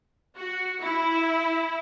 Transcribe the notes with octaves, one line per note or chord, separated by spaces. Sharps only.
F#4
E4